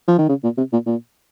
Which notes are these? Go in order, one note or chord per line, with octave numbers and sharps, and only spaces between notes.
F3
D#3
C#3
A#2
C3
A#2
A#2